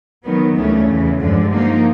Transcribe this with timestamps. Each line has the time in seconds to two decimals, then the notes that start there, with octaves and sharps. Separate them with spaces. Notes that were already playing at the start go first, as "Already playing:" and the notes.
0.23 D#3 F#3 B3
0.56 D2 C#3 E3 A3 C#4
0.88 E2 C#3 E3
1.20 G2 D3 F3 G#3
1.53 F3 A#3 D#4